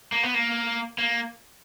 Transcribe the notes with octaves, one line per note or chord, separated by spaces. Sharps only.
A#3
B3
A#3
A#3